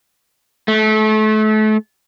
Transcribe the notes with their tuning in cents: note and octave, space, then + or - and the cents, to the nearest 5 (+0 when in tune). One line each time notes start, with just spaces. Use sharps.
A3 -30